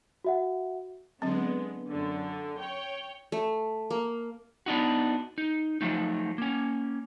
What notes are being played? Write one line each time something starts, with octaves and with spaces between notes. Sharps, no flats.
F#4 E5 F#5
D3 F#3 G#3 B3 C4
F#2 D3
C#5 G5
A3
A#3
B3 D4 D#4 F#4
D#4
F3 F#3 A3 D#4
A#3 C#4